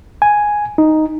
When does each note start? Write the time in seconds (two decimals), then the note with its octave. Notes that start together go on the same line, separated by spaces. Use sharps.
0.22 G#5
0.78 D#4